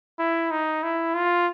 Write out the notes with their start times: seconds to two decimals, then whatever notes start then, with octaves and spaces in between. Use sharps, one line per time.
0.19 E4
0.51 D#4
0.83 E4
1.14 F4